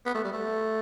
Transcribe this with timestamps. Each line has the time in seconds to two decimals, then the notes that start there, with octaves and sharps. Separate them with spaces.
0.06 B3
0.15 A3
0.24 G3
0.33 A3